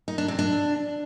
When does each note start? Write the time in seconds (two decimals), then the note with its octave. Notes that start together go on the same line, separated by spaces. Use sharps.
0.08 D#4
0.18 D4
0.28 C3
0.39 D4